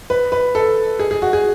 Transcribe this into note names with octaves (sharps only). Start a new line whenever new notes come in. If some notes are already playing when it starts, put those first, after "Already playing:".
B4
B4
A4
G#4
G#4
F#4
G#4